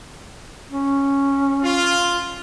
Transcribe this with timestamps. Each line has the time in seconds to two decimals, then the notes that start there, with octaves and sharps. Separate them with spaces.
0.71 C#4
1.64 F4